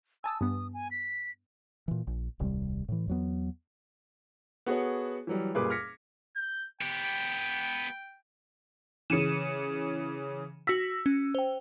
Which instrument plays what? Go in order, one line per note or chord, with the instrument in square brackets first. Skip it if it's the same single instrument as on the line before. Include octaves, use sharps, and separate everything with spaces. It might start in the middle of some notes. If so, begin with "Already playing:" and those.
[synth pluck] G#5 A5 D#6 [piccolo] E6
[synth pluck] G2 B3 [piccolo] D#6
[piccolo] G#5
B6
[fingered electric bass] A#2 E3
A#1
D#1 C2 C3 G3
A2 E3
E2 F#3 B3
[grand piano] B3 F#4 G#4 A4 C#5
E3 F#3 G3
F#1 A#2 G3 G#4 B4 D6
D6 F6 G#6 A#6 B6 C#7
[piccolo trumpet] G6
[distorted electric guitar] B3 G4 [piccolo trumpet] G5
[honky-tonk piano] C#3 E3 [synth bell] C#7 D#7 E7
[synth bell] F#4 A#6 B6 [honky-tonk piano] E6
[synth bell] C#4
C5 G5